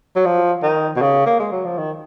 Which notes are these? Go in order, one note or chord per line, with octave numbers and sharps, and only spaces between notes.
F#3
F3
D#3
B2
C#3
A#3
G#3
F#3
F3
D#3